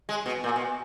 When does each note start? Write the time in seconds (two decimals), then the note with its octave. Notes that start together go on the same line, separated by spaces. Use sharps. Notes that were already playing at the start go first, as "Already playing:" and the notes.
0.09 G#3
0.26 B2
0.44 A#2
0.56 B2